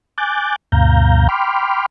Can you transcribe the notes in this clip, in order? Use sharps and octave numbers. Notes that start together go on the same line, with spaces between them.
G#5 D6 F#6 G6 A6
D2 G2 B2 F5 A#5 G6
G5 B5 C6 D6 F6